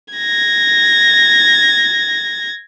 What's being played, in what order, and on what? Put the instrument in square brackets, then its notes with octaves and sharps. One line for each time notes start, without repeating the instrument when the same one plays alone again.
[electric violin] G#6 A#6